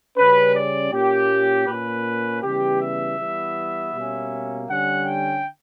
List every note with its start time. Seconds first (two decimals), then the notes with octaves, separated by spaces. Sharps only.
0.17 C#3 G3 C#4 B4
0.55 D5
0.92 A#2 A#3 C#4 G4
1.68 A#2 A#3 C#4 B4
2.43 C#3 E3 G3 B3 G4
2.81 E5
3.19 E3 G3 B3
3.94 B2 G3 A#3 C#4
4.68 D3 G3 C#4 F#5
5.06 G5